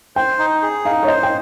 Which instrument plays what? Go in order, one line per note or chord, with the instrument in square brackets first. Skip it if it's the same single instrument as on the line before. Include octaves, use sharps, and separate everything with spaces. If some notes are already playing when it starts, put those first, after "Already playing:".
[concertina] C5 [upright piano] G5
[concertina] D#4
G#4
[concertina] D#4 [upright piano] F5
[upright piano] C#5
[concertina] C5 [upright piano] D#5
[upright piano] G5